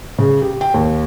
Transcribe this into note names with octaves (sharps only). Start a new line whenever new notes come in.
C#3
G4
G5
D#2